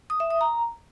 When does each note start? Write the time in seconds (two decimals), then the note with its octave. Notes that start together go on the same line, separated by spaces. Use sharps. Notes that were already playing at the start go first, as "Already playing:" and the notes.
0.10 D#6
0.20 E5
0.30 D#6
0.41 A#5